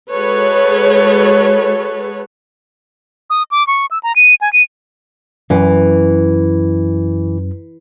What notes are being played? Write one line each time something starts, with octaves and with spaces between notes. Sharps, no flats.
G#3 F#4 G#4 A4 B4 C#5
D#6
D6
C#6
E6
A#5
D#7
G#5
D#7
F#2 E3